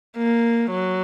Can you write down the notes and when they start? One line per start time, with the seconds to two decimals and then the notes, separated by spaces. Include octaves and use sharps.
0.17 A#3
0.71 F#3